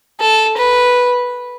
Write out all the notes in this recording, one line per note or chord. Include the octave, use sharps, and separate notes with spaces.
A4
B4